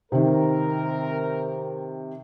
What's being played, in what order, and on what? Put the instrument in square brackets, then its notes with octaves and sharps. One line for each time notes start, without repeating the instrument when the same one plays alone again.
[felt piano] C3 D#3 [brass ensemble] C4 A#4